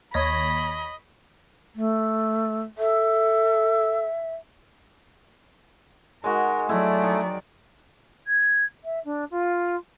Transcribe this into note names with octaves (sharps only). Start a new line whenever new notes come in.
D#2 C#5 D#5 B5 A#6
A3
A4 E5
G#3 D#4 F#4 A#4
F#3 A3 E4 D5
D#3 D#4 A#4
G#6
E5
D4
F4